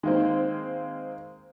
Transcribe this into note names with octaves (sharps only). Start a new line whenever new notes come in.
D#3 G#3 A#3 C4